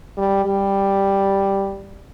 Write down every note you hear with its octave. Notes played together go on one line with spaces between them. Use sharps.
G3
G3